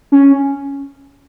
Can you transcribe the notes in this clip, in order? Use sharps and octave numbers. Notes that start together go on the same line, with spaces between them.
C#4